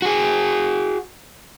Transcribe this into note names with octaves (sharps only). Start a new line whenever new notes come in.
F#4 G#4